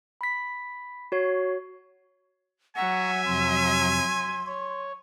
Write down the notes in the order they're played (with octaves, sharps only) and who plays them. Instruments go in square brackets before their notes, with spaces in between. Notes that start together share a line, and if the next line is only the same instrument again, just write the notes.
[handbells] B5 B6
F#4 C#5 C7
[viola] F#3 E5 [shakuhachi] F#5 [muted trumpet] G#5 [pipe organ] A#5 C#6
[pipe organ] F2 C3 [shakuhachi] C6
[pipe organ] C#5